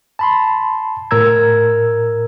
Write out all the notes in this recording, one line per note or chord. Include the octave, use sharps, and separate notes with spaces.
A5 B5 C6
A2 A#4 A#5 E6 G#6